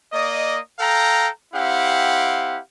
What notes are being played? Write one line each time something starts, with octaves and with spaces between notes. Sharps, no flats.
A#3 D5 D#5
A4 F5 G5 A#5
C4 E4 G4 F5 F#5